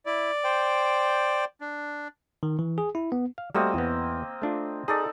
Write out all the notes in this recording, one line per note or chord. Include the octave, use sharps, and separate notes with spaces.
E4 D5
C5 G5
D4
D#3
E3
G#4
E4
B3
F5
G3 A3 A#3 C4 F#4 D#5
E2 B3
A3 D4 F4
D#4 G#4 A4 D5